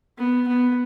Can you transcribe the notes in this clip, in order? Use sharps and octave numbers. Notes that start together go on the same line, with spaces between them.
B3
B3